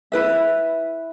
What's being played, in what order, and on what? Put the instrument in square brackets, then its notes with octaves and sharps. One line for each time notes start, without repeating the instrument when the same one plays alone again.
[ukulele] E4 B4 E5